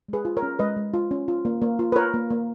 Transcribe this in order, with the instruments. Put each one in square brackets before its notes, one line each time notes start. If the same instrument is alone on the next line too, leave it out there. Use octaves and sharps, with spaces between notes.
[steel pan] G#3 G#4 B4
F4
A#4 C#5
C#4
G#3 B4 D#5
G#3
F4
C#4
F4
A#3
A#3
F4
B4
F4 A#4 C#5
A#3
A#3